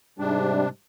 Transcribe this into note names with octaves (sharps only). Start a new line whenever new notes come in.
G#2 C3 G3 D4